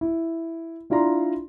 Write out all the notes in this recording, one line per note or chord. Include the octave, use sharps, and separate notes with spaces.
E4
D4 E4 F4 D5 A#5 C6